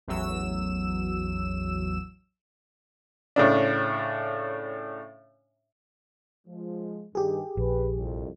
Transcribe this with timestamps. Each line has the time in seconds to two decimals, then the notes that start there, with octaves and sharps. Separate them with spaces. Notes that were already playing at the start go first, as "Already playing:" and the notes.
0.07 A1 E2 F#3 E6 E7
3.36 A2 C#3 D4
6.46 F3 G#3
7.15 G2 D#3 G4 G#4
7.57 A#1 B4
7.96 C2 F2